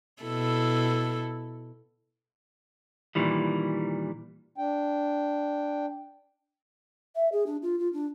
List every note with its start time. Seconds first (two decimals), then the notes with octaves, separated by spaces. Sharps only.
0.23 B2 E4 A4
3.15 A#2 D#3 E3 G3
4.58 D4 G5
7.16 E5
7.32 G#4
7.46 D4
7.62 F4
7.79 F4
7.93 D4